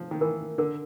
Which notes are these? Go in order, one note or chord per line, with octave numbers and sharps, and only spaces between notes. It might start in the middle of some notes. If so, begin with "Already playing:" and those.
Already playing: F3
D#3
E3 A#4
D3 A#4